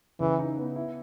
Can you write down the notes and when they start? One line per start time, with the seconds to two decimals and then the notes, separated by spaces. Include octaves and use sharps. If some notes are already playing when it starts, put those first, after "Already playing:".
0.20 C#3 E3
0.39 D#4
0.57 B3
0.76 E4